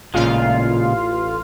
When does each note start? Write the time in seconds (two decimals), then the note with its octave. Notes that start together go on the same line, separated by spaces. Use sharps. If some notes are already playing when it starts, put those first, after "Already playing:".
0.14 A1 A#2 C#3 G#3 F4 F5